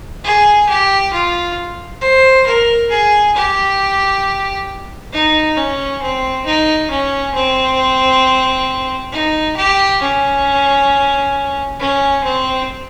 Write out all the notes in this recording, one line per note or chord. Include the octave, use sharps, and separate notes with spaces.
G#4
G4
F4
C5
A#4
G#4
G4
D#4
C#4
C4
D#4
C#4
C4
D#4
G4
C#4
C#4
C4